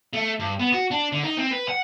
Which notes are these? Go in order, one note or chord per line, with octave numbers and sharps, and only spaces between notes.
A3
G2
B3
F#4
D4
D3
D#4
C4
B4
F#5